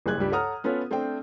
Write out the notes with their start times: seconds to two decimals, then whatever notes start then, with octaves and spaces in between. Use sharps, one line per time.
0.06 F#1 G3 G#4 F#6 G#6
0.18 C#2 G2 G3 G4
0.31 A4 C#5 F#5 A#5 D#6 F6
0.64 B3 C#4 F4 A4 B4 C#5
0.91 A3 C4 D4 C5 G5